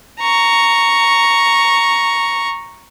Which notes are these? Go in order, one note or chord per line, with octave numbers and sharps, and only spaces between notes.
A#5 C#6